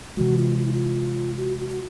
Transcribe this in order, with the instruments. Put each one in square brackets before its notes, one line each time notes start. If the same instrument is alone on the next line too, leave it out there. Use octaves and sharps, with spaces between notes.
[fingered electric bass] C3 E3 G#3 [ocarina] F#4
[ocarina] F4
F4
E4
F4
F#4
F#4
F#4